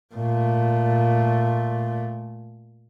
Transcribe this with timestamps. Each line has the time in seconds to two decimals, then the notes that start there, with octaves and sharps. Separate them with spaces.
0.14 A#2 A3